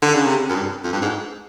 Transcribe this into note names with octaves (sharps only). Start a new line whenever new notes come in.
D3
C#3
C3
F#2
G2
F2
G2
G#2